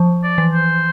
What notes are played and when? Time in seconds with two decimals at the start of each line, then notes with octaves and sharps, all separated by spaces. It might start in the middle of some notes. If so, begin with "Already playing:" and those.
Already playing: F3
0.23 D5
0.38 E3
0.53 C5